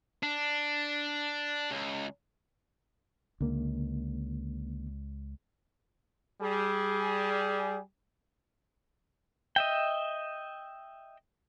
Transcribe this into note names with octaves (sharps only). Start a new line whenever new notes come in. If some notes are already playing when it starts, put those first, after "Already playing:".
D4
C#2
C#2 D3 A#3
G3 G#4
D#5 E5 G5